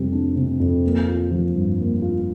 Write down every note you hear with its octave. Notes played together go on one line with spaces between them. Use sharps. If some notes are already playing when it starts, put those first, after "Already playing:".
Already playing: F2 C3 G3
D4
C3
F2
A#3
F4
F3
G2
A#3
F4